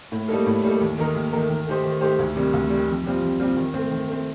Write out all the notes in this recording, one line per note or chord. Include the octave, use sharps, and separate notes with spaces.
A2
G3 A#3 D#4 A4
A2
G3 A#3 D#4 A4
D#2
D#3 A3 D#4 A#4
D#2
D#3 A3 D#4 A#4
D#3
A3 D#4 G4 C5
D#3
A3 D#4 G4 C5
D2
C3 D#3 G3
D2
C3 D#3 G3
F2
C3 G3 C4 F4
F2
C3 G3 C4 F4
D#3
A3 C4
D#3
A3 C4